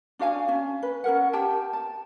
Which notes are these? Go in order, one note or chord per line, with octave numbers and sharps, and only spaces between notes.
D4 F#4 F5 G#5
C#4
B4
C#4 A4 A#4 F#5
G4 G5 A5
A5